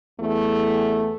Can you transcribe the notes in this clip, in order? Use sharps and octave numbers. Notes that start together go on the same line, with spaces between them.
E2 A3